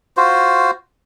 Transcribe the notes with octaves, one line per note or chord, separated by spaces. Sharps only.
F4 F#4 C5